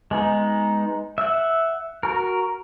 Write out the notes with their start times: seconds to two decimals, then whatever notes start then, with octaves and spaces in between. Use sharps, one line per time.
0.11 G#3 B3 D#4
1.18 E5 F#5
2.03 F#4 A#4